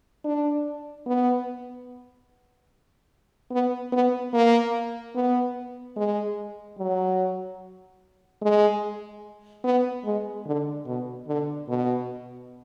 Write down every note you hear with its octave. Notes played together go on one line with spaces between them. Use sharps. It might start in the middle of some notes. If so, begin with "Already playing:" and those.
D4
B3
B3
B3
A#3
B3
G#3
F#3
G#3
B3
G#3
D3
B2
D3
B2